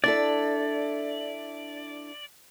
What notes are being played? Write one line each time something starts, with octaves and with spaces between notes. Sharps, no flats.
D4 E4 A4 D5